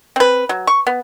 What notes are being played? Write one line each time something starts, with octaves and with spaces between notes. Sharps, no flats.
C4 B4
F#3
C#6
B3